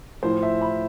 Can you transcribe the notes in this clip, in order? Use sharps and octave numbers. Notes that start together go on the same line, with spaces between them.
A2 F3 C5
E5
B5